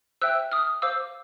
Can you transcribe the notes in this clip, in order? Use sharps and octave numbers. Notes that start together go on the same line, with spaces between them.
C5 E5 G5 E6 F#6
D#6 F6
C5 F5 D6 E6